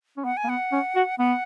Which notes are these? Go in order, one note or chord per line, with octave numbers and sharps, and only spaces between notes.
C#4
B3 F#5
G#5
A#3
B3 F#5
C#4
F#4
B3 F#5